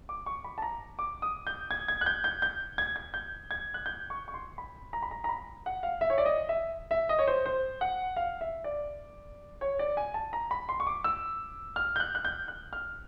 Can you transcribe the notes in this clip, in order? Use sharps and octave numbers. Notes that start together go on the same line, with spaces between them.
D6
C#6
B5
A5
A#5
D6
D#6
G6
G#6
G#6
F#6
G6
G6
G6
G#6
G#6
G6
G#6
F#6
G6
C#6
C#6
C6
B5
A#5
B5
A#5
A#5
B5
F#5
F5
E5
C#5
D5
D#5
E5
E5
D#5
C#5
C5
C5
F#5
F5
E5
D5
C#5
D5
G#5
A5
A#5
B5
C6
C#6
D6
E6
F6
G6
F#6
F#6
G6
F#6
F6